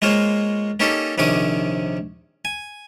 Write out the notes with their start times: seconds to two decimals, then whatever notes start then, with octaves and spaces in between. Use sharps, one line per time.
0.02 G#3 A#3 F4 C5 C#5
0.80 A#3 C#4 D#4 G4 A4
1.18 A#1 C3 D#3 C#4 D6 D#6
2.45 G#5